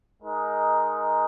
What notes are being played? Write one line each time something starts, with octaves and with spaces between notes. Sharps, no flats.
G#3 D#4 A#4